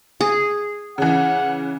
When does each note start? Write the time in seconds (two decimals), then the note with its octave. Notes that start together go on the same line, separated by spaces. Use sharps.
0.21 G#4
0.98 C#3 E3 F#5